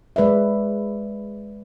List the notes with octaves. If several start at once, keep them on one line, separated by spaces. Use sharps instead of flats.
G#3 B4 D5 E5